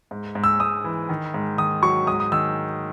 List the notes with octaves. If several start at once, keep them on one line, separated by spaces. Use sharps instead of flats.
G#2
G#2
E6
G#2 D#6
E3
D#3
G#2
D#3 D#6
F#3 C#6
G#2 D#6
D#6
D#3 E6